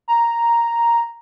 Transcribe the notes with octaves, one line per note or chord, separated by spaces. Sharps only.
A#5